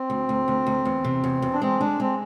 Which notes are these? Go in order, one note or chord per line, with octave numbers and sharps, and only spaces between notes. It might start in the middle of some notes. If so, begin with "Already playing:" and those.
Already playing: C4
D2
D2
D2
D2
E2
C3
E2
E2
D4
G#3 C4
G#3 D4
G#3 C4